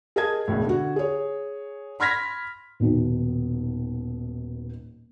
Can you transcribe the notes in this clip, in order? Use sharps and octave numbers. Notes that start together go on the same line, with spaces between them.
G#4 A#4 D#5 A5 G#6
E1 C#2 A2
D3 F#4
G#4 C#5
B5 C6 F6 G#6 A#6 B6
D#1 B2 D#3